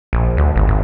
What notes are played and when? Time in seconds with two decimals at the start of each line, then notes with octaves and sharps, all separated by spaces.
0.13 A#1
0.37 D2
0.56 G#1
0.67 G#1